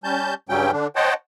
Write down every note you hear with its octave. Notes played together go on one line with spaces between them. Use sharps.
G3 C#4 A5 G6
G2 C#3 F#3 G3 C#4 G5
D3 D4
C5 C#5 D#5 F#5 G5 A5